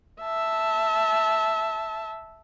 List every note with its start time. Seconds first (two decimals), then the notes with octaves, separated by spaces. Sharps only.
0.22 E5 A5